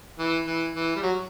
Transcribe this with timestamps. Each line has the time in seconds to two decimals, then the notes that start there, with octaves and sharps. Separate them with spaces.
0.19 E3
0.46 E3
0.74 E3
0.96 G3
1.03 F#3